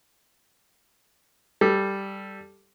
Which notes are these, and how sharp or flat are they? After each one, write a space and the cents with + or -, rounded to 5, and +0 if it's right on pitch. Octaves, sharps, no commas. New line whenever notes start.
G3 +0 A4 +0